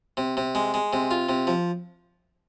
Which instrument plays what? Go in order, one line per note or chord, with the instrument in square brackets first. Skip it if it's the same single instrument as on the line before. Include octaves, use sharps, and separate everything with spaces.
[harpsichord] C3
C3
G#3
G#3
C3
F4
C3
F3